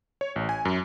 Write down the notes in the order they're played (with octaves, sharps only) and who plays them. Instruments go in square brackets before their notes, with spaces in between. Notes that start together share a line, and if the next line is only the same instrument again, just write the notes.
[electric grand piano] C#5
A1
G#5
F#2